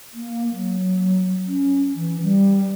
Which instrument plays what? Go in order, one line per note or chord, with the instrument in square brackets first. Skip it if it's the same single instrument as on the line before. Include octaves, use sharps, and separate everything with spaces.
[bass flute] A#3
F#3
C#4
E3
G3